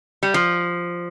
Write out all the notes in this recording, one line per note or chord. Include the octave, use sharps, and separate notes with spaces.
G3
F3